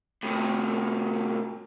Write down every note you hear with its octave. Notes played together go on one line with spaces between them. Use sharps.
A2 C3